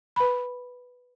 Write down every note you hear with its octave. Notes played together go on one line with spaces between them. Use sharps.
B4 B5